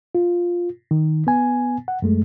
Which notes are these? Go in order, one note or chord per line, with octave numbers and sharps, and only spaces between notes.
F4
D#3
B3 G#5
F#5
F#2 G#3 A3